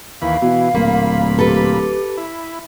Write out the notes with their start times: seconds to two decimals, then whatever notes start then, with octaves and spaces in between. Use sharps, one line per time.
0.22 D#2 E3 F5 B5
0.42 B2 E3
0.75 D1 A#2 A#3 B5
1.38 G4 A4 B4
2.18 E4